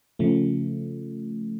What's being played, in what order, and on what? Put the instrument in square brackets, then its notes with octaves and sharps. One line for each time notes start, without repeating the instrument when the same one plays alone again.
[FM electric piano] C#3 F3 A3